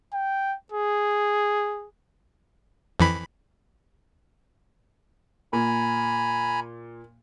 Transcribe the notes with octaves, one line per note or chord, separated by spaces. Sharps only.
G5
G#4
F2 E3 B5
A#2 G#5 A#5 B5